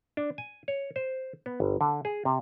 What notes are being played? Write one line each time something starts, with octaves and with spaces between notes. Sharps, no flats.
D4
G#5
C#5
C5
B3
G1
D3
G#4
C3